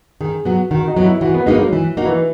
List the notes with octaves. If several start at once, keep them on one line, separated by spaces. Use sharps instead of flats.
D#3 G#4
F#3 B3 F#4
D#3 F#4
D#4
F#3 B3
E4
E3 F#4
B3
G#3 A#3 D#4 F#4
F#3
E3
A#3 D#4 F#4
E3